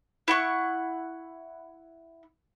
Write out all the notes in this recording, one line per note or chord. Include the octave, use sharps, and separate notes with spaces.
E4 F#5 C#6